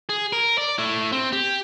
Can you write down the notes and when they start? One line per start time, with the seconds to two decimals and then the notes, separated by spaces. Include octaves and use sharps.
0.09 G#4
0.33 A#4
0.58 D5
0.78 A3 E4
1.12 C4
1.32 G4